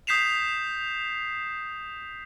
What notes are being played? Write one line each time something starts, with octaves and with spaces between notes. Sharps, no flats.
D#6 G6 B6 C7 E7 F7